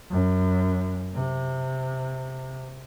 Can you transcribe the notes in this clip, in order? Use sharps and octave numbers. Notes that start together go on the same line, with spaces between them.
F#2
C3